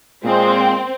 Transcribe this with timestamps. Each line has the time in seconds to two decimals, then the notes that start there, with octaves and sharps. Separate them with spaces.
0.25 A#2 G#3 C4